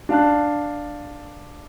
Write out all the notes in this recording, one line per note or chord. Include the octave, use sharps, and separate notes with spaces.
D4 F5 A5 F#6